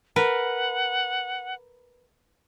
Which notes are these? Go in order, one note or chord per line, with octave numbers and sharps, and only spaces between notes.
A#4 B4 F#5